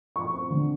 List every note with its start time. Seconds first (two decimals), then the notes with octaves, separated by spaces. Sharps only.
0.16 F3 C#6
0.34 C4
0.50 D3